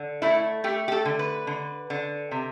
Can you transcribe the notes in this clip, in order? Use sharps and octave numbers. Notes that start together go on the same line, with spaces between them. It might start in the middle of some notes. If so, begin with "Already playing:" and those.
Already playing: D3
A3 E4
A3 G4
G4
A4
D3
B4
D3
D3
C3